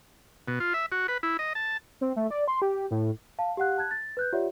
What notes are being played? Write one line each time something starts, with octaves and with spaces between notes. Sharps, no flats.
B2
F4
E5
F#4
B4
E4
D#5
A5
C4
A3
D5
C6
G4
A2
F5 A5
G4 F5 F#5 F#6
A5 F#6 G#6
A6
B4 F#6 G6
F4 G4 C#5 D5 E5 F#5